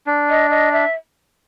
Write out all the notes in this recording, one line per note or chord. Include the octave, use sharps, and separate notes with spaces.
D4
D#5
D#5
E5